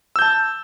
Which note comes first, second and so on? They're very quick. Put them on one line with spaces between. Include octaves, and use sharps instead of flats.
E6 G6 A5